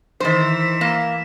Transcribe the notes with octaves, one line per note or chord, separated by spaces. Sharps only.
D#3 E3 C5 E5
A#3